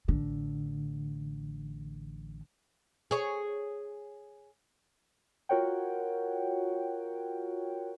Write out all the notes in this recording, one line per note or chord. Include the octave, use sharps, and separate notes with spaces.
A1 D3
G#4 C#5
F4 F#4 A#4 C#5 F#5 G5